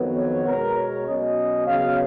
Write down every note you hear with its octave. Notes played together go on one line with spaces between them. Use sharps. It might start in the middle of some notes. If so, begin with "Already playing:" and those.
Already playing: F2 D#3 F#3 B3
C#5
B2 G#3 B3 A#4
C#5
B2 F#3 C#4 D#5
C#3 F#3 B3 F5